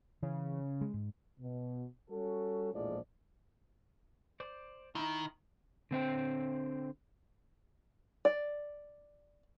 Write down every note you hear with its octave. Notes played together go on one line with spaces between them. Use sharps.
C#3 E3
G#3
G#2
B2
G3 C#4 F#4 A4
A#1 E2 A2 F3 G#3 D5
C5 D5
D#3 D#4 E4
D3 C4 C5 G5
D5